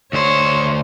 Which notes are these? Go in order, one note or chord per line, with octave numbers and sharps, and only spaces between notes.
D2 C5 C#5